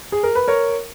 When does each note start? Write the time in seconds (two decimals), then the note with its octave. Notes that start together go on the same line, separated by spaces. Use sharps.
0.12 G#4
0.23 A#4
0.35 B4
0.48 A#4 C#5